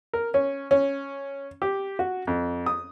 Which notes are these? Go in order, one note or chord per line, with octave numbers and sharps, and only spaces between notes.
A#4
C#4
C#4
G4
F#4
F2
D#6